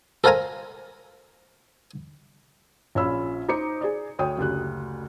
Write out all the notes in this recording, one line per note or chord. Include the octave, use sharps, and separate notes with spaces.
A4 A#4 C5 F5 G#5 A#5
A#1 C#4 F4 B5 E6
D#4 C5 D6 C#7
G#4 D5
D2 C#5 G5 D#6
F#1 D2 G4 F#6